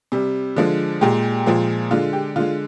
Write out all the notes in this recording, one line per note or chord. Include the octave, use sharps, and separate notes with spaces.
C3 G3
D3 F3 G#3
A#2 G#3 G4
A#2 F3 G#3
D3 G#3 F4
G4
D3 G#3 F4